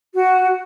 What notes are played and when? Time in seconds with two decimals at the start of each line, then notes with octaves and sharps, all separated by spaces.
0.15 F#4